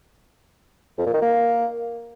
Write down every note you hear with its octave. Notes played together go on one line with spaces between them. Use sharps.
F2
A#2
D#3
A#3